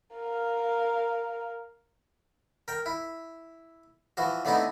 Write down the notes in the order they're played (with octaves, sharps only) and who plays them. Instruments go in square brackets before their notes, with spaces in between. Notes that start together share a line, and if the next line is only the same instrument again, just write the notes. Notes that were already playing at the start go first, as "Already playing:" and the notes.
[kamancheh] A#4 F5
[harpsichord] A#4 G5
E4
E3 F3 F#4
D3 A3 B3 C4 D#4 E4